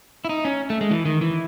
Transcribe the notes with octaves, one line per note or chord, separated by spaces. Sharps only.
E4
D#4
C#4
A3
G#3
E3
D#3
E3